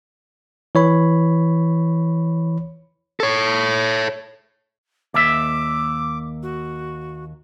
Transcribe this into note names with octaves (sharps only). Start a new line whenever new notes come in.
E3 C#5 B5
A4 C#5
D#2 E5 D6
F#4